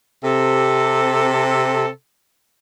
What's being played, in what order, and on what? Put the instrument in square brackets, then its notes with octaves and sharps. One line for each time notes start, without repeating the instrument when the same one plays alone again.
[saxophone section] C3 A4